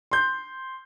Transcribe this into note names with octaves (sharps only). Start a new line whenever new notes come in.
C6 G6